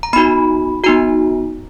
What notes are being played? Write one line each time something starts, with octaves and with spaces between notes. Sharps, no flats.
A#5
B3 D#4 F#4 B5
B3 D#4 F#4 A#5